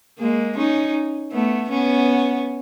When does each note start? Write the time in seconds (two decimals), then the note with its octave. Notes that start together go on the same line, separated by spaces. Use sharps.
0.19 G#3 A#3
0.57 C#4 D#4
1.32 A3 B3
1.71 B3 C#4